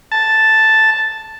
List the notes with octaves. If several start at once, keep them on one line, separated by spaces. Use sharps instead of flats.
A5